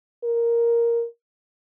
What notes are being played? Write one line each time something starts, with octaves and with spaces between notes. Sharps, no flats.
A#4